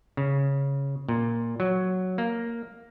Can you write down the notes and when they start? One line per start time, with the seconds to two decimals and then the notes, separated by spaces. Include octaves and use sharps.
0.17 C#3
1.09 A#2
1.60 F#3
2.18 A#3